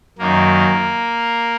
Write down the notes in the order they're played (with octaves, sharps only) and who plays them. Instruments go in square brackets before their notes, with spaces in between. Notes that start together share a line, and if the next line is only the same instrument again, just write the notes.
[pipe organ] F#2 D#3 A#3